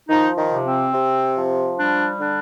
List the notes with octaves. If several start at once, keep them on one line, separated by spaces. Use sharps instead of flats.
D#3 F3 D#4
D#3 D#4
C3
C4
C3
F3
G3 D4
D3 D4